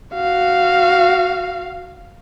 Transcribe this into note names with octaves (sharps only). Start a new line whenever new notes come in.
F#4 F5